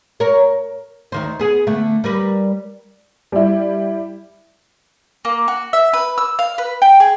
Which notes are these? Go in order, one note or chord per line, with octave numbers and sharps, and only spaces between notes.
A#4 C#5
D2 D#3 C5
B3 G#4
D3 A3 B3
G3 A#4 B4
G3 E4
A#3
F#4
E5
B4
E6
F5
B4
G5
G#4